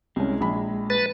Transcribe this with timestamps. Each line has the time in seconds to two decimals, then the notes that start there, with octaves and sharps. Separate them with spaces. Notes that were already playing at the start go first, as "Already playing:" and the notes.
0.16 C2 G#3 C#4
0.40 A#1 B5
0.90 B4 A6